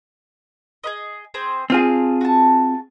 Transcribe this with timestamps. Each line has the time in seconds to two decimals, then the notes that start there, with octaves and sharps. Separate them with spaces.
0.84 G#4 B4 D#5
1.34 C4 G#4 C5
1.70 C4 D4 F4 G#4
2.21 F#4 A5